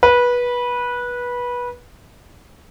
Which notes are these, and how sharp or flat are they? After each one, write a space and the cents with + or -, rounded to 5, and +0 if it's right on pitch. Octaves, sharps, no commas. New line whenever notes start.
B4 -20